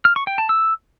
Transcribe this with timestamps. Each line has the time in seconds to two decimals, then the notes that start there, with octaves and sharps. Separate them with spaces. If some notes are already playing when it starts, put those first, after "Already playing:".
0.05 F6
0.16 C#6
0.27 G5
0.38 A5
0.49 E6